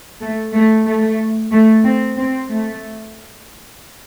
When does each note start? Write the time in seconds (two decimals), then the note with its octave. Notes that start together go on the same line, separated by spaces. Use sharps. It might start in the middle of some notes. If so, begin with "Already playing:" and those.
0.22 A3
0.54 A3
0.87 A3
1.52 A3
1.84 C4
2.17 C4
2.48 A3